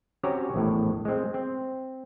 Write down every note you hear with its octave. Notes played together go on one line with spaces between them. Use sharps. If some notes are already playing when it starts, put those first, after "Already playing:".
C4 C#4 F#4 G4 C#5 A#5
A#1 E2 A2
G#3 C4
C4